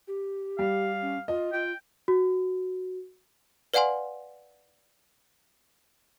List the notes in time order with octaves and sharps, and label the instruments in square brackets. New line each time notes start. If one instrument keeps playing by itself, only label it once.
[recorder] G4
[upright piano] G3 [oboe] F5
[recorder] C#4
[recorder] F4 [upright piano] D#5
[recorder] F4 [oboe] G5
[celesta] F#4
[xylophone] B4 D5 F5 F#5 G#5 C6